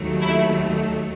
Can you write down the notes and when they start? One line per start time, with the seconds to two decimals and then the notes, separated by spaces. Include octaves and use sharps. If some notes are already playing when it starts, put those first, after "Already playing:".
Already playing: D#2 D#3 F#3 A3
0.22 E4